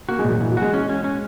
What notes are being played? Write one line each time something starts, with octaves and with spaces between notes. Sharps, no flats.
A#3 F#4
G#3
A#2
F#3
A#2 E3
F#3
G#3 F#4
C#4
C#4
C#4